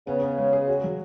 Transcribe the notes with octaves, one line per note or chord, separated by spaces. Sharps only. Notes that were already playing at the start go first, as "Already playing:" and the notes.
C#3 B3
B3
G#3
G#4
F#4
F#3